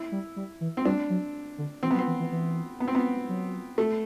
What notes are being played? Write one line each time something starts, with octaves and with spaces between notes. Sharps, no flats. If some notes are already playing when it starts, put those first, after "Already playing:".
Already playing: E4
G3
G3
E3
C4
G3 D4
F#3
D3
E3 C4
B3
F#3
C4
E3
E3
E3
B3
C4
B3
F#3
A3